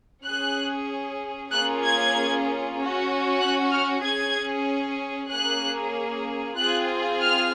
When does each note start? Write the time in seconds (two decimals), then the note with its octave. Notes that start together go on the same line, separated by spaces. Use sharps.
0.24 C#4 G#4 F#6
1.50 A#3 C#4 F4 G#4 F#6
1.82 G#6
2.77 C#4 F#4
3.40 F#6
3.72 F6
4.04 C#4 G#4 G#6
5.30 A#3 C#4 G#4 F#6
6.56 C4 F4 G#4 F#6
7.20 F6